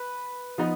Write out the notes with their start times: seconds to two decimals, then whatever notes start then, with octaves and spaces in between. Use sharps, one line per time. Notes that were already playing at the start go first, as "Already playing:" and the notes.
Already playing: B4
0.58 F3 B3 D#4